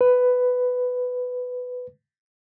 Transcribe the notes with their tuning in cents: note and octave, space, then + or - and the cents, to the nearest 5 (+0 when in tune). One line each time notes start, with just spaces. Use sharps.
B4 +10